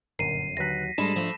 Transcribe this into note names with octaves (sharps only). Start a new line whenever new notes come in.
G1 F#2 A#2 D3 A#4 C7 D#7
D#2 D3 F#3 B4 F#6 A#6 B6
G#2 G3 G#3 D4 A4 A5 B5 E7
F3 A3